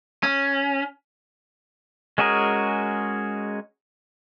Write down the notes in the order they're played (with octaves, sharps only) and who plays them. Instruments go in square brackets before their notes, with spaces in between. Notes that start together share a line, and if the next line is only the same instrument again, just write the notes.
[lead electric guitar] C#4
[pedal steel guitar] G#3 C#4 F#4 G#4 A#4